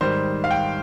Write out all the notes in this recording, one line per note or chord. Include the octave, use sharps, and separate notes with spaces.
G#2 D#3 G3 C5
F5
G5